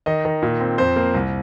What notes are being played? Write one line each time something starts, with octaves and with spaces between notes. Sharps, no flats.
D#3 D#5
D#3
A#2
C4
F2 C5
A#3
C2